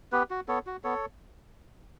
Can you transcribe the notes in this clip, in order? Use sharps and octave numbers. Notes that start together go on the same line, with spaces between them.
B3 G4 B4
F#4
B3 A4 C#5
F#4
B3 A4 C#5